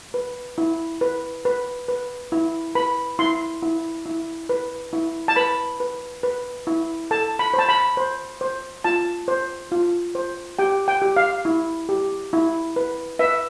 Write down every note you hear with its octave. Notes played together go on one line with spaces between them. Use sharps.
B4
E4
B4
B4
B4
E4
B4 B5
E4 C6
E4
E4
B4
E4
A5
B4 B5
B4
B4
E4
A4 A5
B5
C5
A5
B5
C5
C5
F4 A5
C5
F4
C5
G4 G5
G5
G4
F5
E4
G4
E4
B4
B4 E5